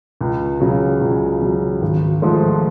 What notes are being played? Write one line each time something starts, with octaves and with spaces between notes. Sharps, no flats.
C#2
C#3 F#3
C#2
C#3 F#3
G#1
G#2 F3 A3